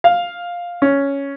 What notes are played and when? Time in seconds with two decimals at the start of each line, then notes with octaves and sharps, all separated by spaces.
0.04 F5
0.82 C#4